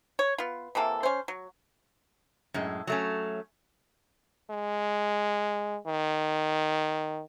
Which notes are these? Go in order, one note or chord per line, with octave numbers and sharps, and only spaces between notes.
C#5
B3 F4
C3 E3 A#3 A4
C#4 C5
F#3
F#2 A2 G#3
F#3 A3 C#4
G#3
D#3